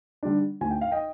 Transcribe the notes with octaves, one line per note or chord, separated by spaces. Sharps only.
D3 G3 D4
D2 G#5
G5
F5
D#5 G5